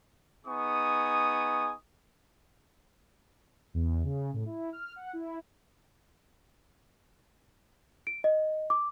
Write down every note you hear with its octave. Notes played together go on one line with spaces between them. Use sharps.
B3 D#4 G#4 G#5 C#6 D#6
E2
C#3
A2
E4
F6
F#5
E4
D7
D#5
D6